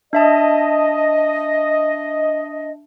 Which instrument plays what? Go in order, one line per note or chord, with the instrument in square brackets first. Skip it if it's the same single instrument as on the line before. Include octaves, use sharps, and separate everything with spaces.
[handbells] D4 E5 A5 [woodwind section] D#5